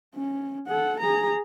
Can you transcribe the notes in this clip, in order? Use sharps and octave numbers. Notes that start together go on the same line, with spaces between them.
C#4
A4 F#5
G#4 A#5